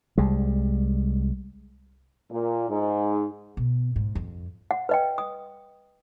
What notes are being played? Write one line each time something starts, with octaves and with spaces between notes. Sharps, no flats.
C2 G3 G#3
A#2
G#2
B2
G#2
F2
F#5
B4 D#5 G5
D#6